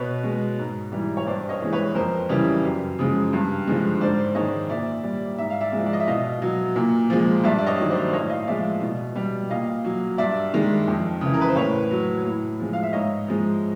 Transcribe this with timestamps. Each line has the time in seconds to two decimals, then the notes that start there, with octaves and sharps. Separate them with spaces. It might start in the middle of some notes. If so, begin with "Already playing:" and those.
Already playing: B2 B4 C#5
0.23 G#3
0.59 G#2
0.92 E3 G3
1.17 C#5
1.26 G2 C5 D5
1.49 C#5 D#5
1.60 E3 G#3
1.73 B4 C#5
1.95 F2 A#4 C5
2.29 C#3 E3 G3
2.64 F#2
2.99 C#3 F3 G#3
3.33 G2
3.67 D3 F3 G#3
4.01 G#2 C5 D5
4.35 D#3 G#3 C#5 D#5
4.70 A#2 D5 E5
5.03 G3
5.38 G#2 E5
5.50 F5
5.61 D5 E5
5.72 G#3
5.78 F3
5.86 D5
5.93 D#5
6.00 E5
6.07 B2 D#5 F5
6.42 F#3
6.76 A#2
7.10 F3 G#3
7.44 G2 D5 E5
7.58 D5
7.67 C#5 D#5
7.79 D#3 F#3
7.89 C5 D5
8.13 A2 C#5 D#5
8.30 D#5 F5
8.43 F5
8.47 F3 G#3 D5 E5
8.82 B2
9.16 G3
9.50 A#2 D#5 F5
9.85 F#3
10.18 G2 D5 E5
10.54 D#3 G#3
10.87 F2
11.21 C#3 E3
11.34 A#4
11.41 B4
11.48 C5
11.56 A2 B4 C#5
11.91 F#3
12.24 A2
12.59 F3 G#3
12.73 F5
12.83 E5
12.93 G#2 C#5 D#5
13.28 F3 G#3